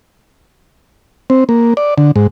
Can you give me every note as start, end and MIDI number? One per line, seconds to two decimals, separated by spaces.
1.30 1.44 60
1.49 1.74 58
1.77 1.94 74
1.98 2.11 50
2.16 2.27 44